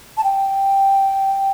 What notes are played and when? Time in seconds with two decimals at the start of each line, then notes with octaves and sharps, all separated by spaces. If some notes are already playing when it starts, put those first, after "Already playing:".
0.17 A5
0.24 G5